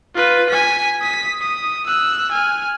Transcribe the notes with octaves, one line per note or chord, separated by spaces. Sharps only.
F4 B4
G#5 B6
D#6 B6
D#6
E6 F#6
G#5 F6